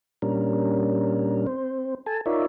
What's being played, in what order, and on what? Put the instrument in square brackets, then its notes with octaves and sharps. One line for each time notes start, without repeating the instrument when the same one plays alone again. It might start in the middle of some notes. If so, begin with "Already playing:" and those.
[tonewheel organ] A#2 G3 C#4 D4 A#4
C4 C5
A4 G#5 A5
D#4 F4 A#4 C#5 D5 E5